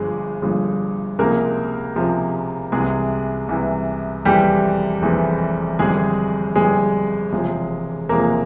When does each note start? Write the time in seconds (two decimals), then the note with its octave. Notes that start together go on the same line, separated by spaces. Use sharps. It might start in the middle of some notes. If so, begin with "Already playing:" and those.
Already playing: G1 G2 F3 G#3 G#4
0.42 G1 G2 F3 G#3
1.19 C#2 C3 F3 G#3 A#3 A#4
1.96 C#2 C3 F3 G#3
2.72 C2 C3 E3 G#3 G#4
3.49 C2 C3 E3
4.25 F1 E2 E3 G3 G#3 G4
5.02 F1 E2 E3 G#3
5.79 G1 F2 E3 G3 G#3 G#4
6.55 G1 F2 E3 G3 G#3 G#4
7.32 E1 E2 C3 F3 G#3
8.09 E1 E2 C3 F3 G#3 A#3 A#4